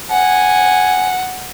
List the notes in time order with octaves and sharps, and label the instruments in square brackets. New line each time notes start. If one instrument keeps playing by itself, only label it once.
[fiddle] F#5 [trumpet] G#5